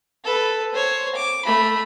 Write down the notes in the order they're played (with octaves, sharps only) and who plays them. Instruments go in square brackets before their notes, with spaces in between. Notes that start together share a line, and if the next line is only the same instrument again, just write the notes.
[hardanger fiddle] A4 B4
C5 C#5
D6
A3 B5